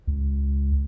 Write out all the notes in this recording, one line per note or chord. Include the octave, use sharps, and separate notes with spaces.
C#2